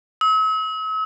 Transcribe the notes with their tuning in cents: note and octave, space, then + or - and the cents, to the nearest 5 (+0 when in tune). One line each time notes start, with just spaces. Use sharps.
E6 -45